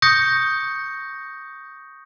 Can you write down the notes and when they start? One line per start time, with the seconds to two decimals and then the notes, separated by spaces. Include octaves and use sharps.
0.02 C#6 D#6 G6 A#6 C#7